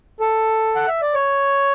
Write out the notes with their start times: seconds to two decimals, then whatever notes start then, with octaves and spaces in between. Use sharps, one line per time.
0.20 A4
0.76 F#5
0.88 E5
1.02 D5
1.14 C#5